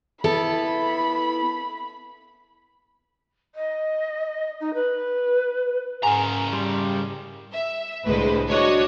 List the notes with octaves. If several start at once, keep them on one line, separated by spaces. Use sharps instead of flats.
B3 E4 A4 B5
D#5
D#4
B4
G#2 C#3 A#4 F#5 G#5
G3 C6
E5
C2 A2 D3 G#3 B4 C5
D4 F#4 C#5 D#5